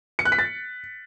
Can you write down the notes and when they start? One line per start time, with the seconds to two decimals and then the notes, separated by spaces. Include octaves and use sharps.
0.19 C#7
0.25 F#6
0.32 B6
0.39 A6